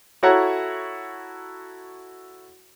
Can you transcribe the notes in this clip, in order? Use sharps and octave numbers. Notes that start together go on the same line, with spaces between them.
E4 F#4 A4 C#5 F#5 A#5